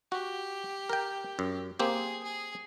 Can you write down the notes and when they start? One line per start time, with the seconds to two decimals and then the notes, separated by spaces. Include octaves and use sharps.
0.12 F#4 G4
0.89 A#4 G5
1.39 F#2
1.79 A#3 C4 G4 G#4
2.23 G#4